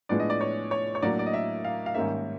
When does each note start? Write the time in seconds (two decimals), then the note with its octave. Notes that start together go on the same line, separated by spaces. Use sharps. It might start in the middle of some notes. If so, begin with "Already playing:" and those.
0.09 A2 F3 G#3 B3 D4 D5
0.20 D#5
0.30 D5
0.41 C#5
0.71 C#5
0.95 C#5
1.02 A2 F#3 A#3 D4 D5
1.19 D5
1.26 D#5
1.33 E5
1.65 F5
1.86 F5
1.94 G#2 D#3 G3 A#3 C#4 E5